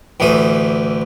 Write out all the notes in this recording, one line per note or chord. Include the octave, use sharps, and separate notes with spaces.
A1 D2 E3 A3 D#6